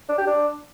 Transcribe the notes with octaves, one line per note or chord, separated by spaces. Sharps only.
D4
G4
D4